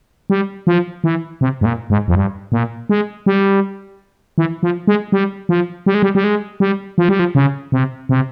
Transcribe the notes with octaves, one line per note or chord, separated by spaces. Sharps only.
G3
F3
E3
C3
G#2
A#2
G#2
F2
G2
A#2
G#3
G3
E3
F3
G#3
G3
F3
G3
G#3
G3
G3
G#3
G3
F3
G3
F3
C#3
C3
C3